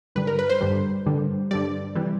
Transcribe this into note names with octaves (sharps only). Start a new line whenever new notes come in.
G2 D3 G3 B4
A#4
B4
C5
G2 D3 G3
G2 D3 G3
G2 D3 G3 D5
C3 E3 G3